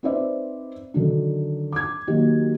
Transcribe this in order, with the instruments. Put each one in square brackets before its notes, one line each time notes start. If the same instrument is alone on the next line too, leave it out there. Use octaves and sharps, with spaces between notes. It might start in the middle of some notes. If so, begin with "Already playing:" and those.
[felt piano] C4 D#4 B4 C5 D5 E5
D3 D#3 F#3 D4
D6 G#6
D#3 F#3 A#3 F#4 G4